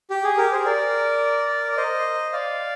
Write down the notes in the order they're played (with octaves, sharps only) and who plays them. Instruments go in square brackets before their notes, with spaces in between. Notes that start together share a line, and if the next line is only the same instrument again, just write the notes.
[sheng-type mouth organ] G4
G#4
G4 A#4
G#4 C5
A#4 D5
D5
C5 D#5
D5 F5